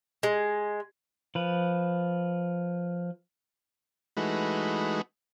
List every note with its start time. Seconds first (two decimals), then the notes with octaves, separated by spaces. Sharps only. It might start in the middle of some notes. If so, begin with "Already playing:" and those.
0.23 G#3
1.35 F3 B4
4.17 E3 G#3 A3 D#4 F#4 B4